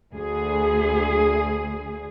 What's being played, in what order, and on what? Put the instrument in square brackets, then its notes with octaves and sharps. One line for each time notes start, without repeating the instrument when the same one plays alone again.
[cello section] D2 G#4